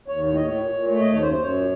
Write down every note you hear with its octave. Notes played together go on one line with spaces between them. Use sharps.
D#2 C#5
A2 C#5
A2 D#5
C#5
A#2
A#2
A3 C#5
D#5
D#2
C#5
F#2 C5
C5
F#2 C#5
A#2